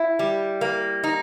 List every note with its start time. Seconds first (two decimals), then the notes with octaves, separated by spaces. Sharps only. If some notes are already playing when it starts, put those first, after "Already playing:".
Already playing: E4
0.19 G3
0.61 A#3
1.04 D#4